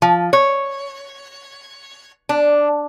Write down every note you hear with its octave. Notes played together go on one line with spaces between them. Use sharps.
F3
C#5
D4